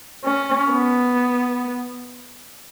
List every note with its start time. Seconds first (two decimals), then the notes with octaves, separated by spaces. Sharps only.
0.24 C#4
0.71 B3